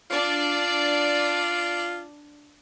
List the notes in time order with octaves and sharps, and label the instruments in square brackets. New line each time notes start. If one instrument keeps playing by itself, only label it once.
[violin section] D4 D5 [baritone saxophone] F4